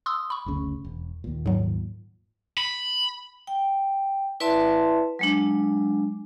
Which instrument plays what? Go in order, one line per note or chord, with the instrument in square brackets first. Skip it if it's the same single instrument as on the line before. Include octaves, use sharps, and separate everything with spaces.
[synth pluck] C6 D#6 E6
B5 C#6
[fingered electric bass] F#1 D2 C#3
E1
D#2 A#2
[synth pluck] G#2 F#3
[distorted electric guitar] B5
[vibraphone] G5
E4 B4 D5 E5 A5 C6
F#3 G#3 D4